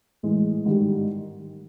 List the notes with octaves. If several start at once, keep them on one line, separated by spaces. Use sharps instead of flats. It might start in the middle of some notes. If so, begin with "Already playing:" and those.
A2 E3 G#3
G#2 D#3 G3